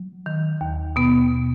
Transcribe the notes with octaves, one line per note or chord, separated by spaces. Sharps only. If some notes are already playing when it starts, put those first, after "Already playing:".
Already playing: F#3
D#3
D#2
B2 B3